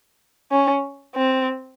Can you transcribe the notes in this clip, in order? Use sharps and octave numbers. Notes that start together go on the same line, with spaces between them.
C#4
C4